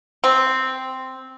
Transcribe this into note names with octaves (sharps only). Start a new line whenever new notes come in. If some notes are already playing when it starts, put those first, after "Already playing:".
C4